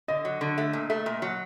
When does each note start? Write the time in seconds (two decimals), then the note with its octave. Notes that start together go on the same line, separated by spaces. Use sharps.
0.08 D3 D#5
0.25 F#3
0.41 D3
0.58 A3
0.73 A#2
0.90 A3
1.06 A#2
1.22 F#3